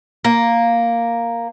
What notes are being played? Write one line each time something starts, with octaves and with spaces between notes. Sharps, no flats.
A#3